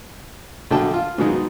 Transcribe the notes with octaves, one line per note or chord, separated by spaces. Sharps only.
A#1 D3 F#3 G5 A5
F4
G#2 B2 D#3 F#3 G#3 D#4